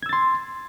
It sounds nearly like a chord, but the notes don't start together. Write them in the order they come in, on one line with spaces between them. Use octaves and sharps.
G#6 E6 A6 C6